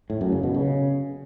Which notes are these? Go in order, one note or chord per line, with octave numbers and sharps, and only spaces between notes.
A2
F#2
C#3
B2
C#3